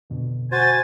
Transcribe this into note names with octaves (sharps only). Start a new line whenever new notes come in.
F2 B2 D3
F#4 C5 G#5 A6